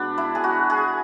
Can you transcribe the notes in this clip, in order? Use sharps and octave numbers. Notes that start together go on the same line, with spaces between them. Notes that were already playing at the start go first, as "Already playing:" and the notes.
Already playing: B2 G#3 B3 D4
E4
G#4
F#4
G#4